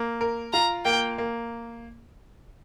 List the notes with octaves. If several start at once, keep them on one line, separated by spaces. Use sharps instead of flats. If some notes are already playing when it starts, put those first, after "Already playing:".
Already playing: A#3
A#4
F4 A#5
A#3 G5
A#3